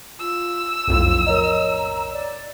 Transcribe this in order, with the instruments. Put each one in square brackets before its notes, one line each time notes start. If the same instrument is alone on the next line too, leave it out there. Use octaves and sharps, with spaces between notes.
[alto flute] F4 [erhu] E6
[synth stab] B1 F2 A2 [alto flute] F4
[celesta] A#4 C#5 D#5 [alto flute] A#5
[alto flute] D5